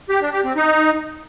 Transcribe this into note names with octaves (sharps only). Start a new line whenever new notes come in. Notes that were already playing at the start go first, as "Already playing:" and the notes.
G4
D4
G4
C4
D#4